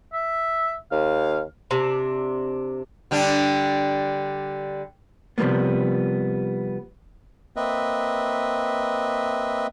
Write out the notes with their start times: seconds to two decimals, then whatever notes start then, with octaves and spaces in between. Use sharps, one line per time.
0.13 E5
0.92 D#2 F5
1.71 C3 D4
3.11 D3 G3 D4
5.38 C3 F3 G3 G#3 A#3 B3
7.56 A#3 C4 B4 D#5 E5